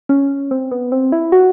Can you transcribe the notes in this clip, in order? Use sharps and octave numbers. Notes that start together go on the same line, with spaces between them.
C#4
C4
B3
C4
E4
F#4